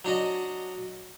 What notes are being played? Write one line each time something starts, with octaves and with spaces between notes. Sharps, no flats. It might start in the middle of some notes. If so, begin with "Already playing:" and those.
F#3 D4 F#4 D#5